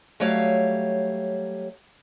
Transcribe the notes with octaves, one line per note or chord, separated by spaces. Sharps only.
F#3 G3 A3 C#5 F5